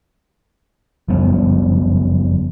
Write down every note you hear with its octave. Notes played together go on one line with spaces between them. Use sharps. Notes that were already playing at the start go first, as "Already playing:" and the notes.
F#1 F2 G3 B3